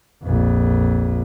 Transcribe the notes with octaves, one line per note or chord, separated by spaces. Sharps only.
A#1 F2